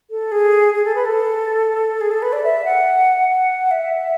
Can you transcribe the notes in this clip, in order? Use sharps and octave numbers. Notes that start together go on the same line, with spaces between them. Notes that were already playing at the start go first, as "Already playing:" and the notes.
A4
G#4
G#4
A4
B4
A4
G#4
A4
B4
D5
E5
F#5
F#5
E5